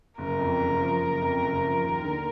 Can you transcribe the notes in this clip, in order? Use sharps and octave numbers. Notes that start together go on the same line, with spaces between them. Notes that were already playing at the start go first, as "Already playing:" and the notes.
F#1 A#4
F2
F#1
F3
F#1
F2
F#1
F3
D#2
D3